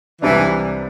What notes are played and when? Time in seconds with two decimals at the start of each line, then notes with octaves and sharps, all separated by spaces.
0.22 C2 C3 E3 G3 D4